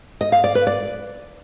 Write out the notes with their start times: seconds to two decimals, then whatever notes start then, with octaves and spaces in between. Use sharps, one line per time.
0.21 D#5
0.32 F5
0.44 D5
0.55 B4
0.67 D5